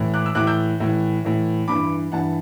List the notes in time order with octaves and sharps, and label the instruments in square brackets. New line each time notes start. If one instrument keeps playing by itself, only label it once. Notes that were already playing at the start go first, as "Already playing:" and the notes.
Already playing: [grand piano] A2 E3
D6 F#6
E6
A2 E3 D6 F#6
E6 G6
A2 E3
A2 E3
G2 E3 B5 D6
G2 E3 F#5 A5